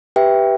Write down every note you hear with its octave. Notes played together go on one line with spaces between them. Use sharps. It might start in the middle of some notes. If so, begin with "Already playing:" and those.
G4 B4 E5 G5